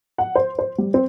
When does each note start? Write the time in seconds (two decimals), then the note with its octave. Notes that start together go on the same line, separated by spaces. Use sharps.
0.18 F#5
0.35 C5
0.59 C5
0.78 G3
0.94 C4